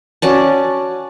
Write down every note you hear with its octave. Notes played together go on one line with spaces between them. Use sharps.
C#4 F#4 D5 A5